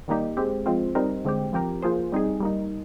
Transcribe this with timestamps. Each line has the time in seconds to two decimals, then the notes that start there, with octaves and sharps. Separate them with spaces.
0.08 D#3 G3 A#3 D#4 G4
0.37 G#3 C4 G4
0.66 F3 G#3 C4 F4
0.95 G3 C4 D#4 A#4
1.25 D3 G#3 C4 G4
1.53 F3 C4 G4 A#4
1.82 F3 A#3 F4 G#4 C5
2.12 G3 C4 D#4 G#4
2.40 G3 A#3 D#4